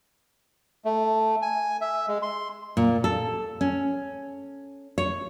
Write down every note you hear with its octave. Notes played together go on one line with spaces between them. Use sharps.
A3
G#5
E5
G#3
C6
A#2
A4
C#4
C#5